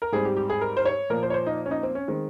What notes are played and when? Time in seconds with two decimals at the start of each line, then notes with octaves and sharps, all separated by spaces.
0.02 A#4
0.12 G#2 G3 C4 G#4
0.25 G4
0.37 G4
0.50 G#4
0.61 A#4
0.77 C5
0.85 C#5
1.10 A#2 F3 A#3 A#4
1.23 C5
1.30 C#5
1.34 C5
1.47 D#4
1.66 C#4
1.71 D#4
1.83 C4
1.95 C#4
2.08 D#3 G#3 C4